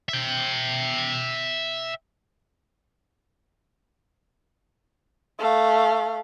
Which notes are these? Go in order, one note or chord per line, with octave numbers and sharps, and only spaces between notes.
E5 G5
A3 F5